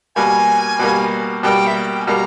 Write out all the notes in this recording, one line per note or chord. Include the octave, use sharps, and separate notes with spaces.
B2 G3 A#3 G#5
B2 G3 A#3
B2 G3 A#3 G5
E5
G5
G#5
B2 G3 A#3 A#5